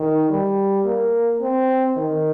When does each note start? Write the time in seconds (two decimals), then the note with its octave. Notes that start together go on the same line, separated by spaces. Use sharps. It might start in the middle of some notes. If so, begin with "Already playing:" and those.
Already playing: D#3
0.30 G3
0.85 A#3
1.41 C4
1.96 D#3